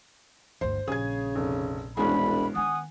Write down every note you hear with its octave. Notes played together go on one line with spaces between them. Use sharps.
G1 D2 C5
A#1 C#3 G#4 G#6
F1
E1 C2 G#3 C#4 D4 B5
D#3 B3 F#5 G#5 D#6